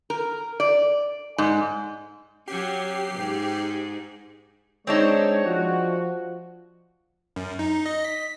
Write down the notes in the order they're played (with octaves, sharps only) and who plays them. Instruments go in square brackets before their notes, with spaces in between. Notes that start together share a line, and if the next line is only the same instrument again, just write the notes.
[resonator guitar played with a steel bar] A#4
D5
G#2
[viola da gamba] F#3 C#4 [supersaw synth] G4 C7
[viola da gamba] G#2
[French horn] G#3 [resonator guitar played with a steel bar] C4 D4 D#4 [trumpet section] C#5
[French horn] F3 [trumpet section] F#4
[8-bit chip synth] F#2
D#4
D#5
B6